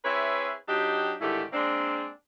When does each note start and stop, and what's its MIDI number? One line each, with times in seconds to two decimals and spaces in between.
0.04 0.52 60
0.04 0.52 64
0.04 0.52 68
0.04 0.52 71
0.04 0.52 73
0.04 0.52 76
0.68 1.14 54
0.68 1.14 62
0.68 1.14 63
0.68 1.14 67
1.20 1.43 44
1.20 1.43 50
1.20 1.43 51
1.20 1.43 57
1.20 1.43 64
1.20 1.43 67
1.52 2.08 56
1.52 2.08 58
1.52 2.08 60
1.52 2.08 62